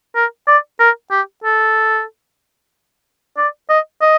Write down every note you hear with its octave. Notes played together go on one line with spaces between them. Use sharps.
A#4
D5
A#4
G4
A4
D5
D#5
D#5